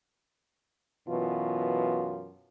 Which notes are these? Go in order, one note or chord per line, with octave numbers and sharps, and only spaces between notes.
F#2 B2 E3 F4